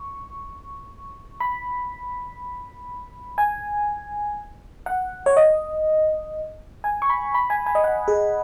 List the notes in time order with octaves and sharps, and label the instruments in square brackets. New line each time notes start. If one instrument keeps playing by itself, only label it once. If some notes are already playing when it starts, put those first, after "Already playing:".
Already playing: [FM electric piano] C#6
B5
G#5
F#5
C#5
D#5
G#5
C#6
B5
B5
G#5
G#5
D#5
F#5
G#4